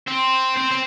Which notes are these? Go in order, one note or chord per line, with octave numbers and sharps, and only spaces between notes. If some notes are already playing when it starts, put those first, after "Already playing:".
C4
C4
C4